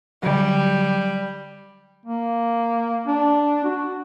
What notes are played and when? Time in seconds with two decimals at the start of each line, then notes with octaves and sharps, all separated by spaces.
0.23 D3 F#3 G3
2.06 A#3
3.07 D4
3.65 F#4